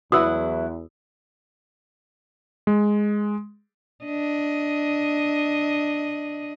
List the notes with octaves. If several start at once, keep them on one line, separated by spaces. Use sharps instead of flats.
E2 F#3 E4 F#4 B4 D#6 E6
G#3
D4 D#5